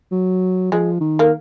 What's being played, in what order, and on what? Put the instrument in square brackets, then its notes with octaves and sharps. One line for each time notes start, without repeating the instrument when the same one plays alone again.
[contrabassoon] F#3
[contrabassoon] F3 [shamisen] G#3
[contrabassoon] D#3
[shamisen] A#3